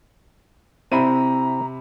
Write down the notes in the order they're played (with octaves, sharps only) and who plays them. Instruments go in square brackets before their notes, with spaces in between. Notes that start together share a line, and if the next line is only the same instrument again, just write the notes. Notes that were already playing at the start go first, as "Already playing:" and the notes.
[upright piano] C3 B5 D#7 [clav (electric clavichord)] C4 E4 E5 [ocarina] A#5